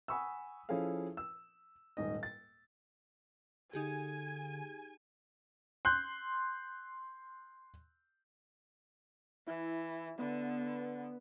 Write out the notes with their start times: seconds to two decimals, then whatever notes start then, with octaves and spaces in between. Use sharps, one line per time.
0.08 F#5 G#5 B5 C#6 D#6 E6
0.69 F3 C#4 E4 G#4 A4 F5
1.17 E6
1.97 D#1 G#2 D#5
2.23 A6
3.73 D3 D#4 G4 G#4 G#5
5.85 C6 F#6 G6
9.47 E3 E4
10.19 D3 B3